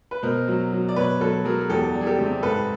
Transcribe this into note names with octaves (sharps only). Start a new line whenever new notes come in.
B4
B2 A#4 C5
F#3
F#3
D5
B2 B4 C#5
F#3 A4 B4
F#3 G#4 A#4
G#4
E2 G4 A4
G3
G#4
G4 A4
C3
G#2 A4 B4